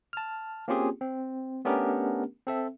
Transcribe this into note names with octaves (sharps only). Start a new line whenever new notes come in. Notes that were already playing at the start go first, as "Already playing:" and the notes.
A5 F6
A#3 C4 C#4 F4 G4 G#4
C4
A3 B3 C#4 D4 G4 A#4
C4 A4 E5